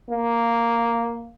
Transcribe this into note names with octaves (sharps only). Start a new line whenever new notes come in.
A#3